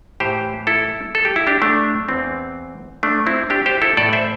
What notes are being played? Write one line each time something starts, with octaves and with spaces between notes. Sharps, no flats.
A2 E3 G4 C5
E4 A4
A4
G4
E4
D4 G4
A3 D4
E2 E3 C4
A3 D4
C4 E4
D4 G4
G4 C5
E4 A4
A2 E3 A4 D5
C5 E5